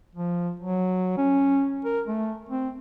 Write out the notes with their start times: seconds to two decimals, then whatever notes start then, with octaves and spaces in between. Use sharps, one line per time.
0.15 F3
0.60 F#3
1.18 C#4
1.85 A#4
2.06 A3
2.49 C4